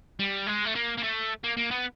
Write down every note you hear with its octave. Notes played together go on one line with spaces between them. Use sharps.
G3
G#3
A3
A#3
A#3
A3
A#3
A#3
B3